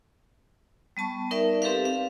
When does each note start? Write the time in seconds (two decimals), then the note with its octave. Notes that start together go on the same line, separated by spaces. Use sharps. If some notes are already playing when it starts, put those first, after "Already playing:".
0.97 G3 B3 A5 C#6
1.31 D#4 A#4 D5 E5
1.62 C4 G4 A4 B4 F5
1.85 F5